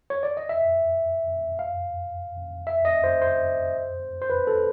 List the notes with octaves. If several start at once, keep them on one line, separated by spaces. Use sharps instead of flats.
C#5
D5
D#5
E5
F5
E5
D#5
C5
C5
C5
B4
A4